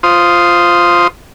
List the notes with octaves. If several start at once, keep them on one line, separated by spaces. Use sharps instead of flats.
F4 C5 C6 D#6